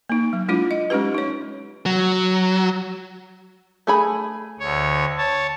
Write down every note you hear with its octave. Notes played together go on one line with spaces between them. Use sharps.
A#3 D#4
F#3
G#3 D4 E4 F4
D#5
G#3 C#4 D#4 G4 B4
D#4 C#5
F#3
A3 G#4 B5
D2 C#5
C#5 A5